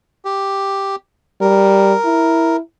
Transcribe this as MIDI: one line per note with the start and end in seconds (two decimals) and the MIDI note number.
0.25 0.96 67
1.41 1.94 55
1.41 2.57 70
2.05 2.60 64